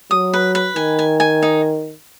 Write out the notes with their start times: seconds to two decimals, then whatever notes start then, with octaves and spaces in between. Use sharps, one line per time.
0.11 F#3 D#6
0.33 B4
0.55 B4
0.76 D#3 G#5
0.99 G#5
1.20 G#5
1.43 D#4